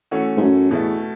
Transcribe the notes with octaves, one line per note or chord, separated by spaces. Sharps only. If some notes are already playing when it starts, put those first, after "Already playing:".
E3 A3 C#4 F#4 A4
G#2
F#2
E2 B2 A3 E4